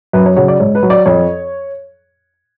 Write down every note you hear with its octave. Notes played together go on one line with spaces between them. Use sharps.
F#2 B4
C#5
C#3 F#3 C#5
D5
G#2 C#5
B4
F#3
D5
F2 C#5